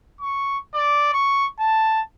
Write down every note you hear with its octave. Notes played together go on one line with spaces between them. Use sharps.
C#6
D5
C#6
A5